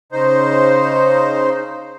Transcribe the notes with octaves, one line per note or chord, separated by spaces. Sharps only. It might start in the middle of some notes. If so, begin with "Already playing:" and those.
C#3 D#4 C5